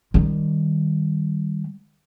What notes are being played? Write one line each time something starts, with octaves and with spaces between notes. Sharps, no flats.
D#3 G3